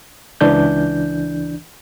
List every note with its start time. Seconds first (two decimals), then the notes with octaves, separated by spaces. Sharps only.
0.41 C#2 E3 D4 G6